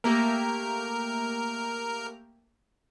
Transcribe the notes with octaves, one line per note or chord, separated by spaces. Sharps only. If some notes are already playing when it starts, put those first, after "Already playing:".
A3 A#3 G4 A#4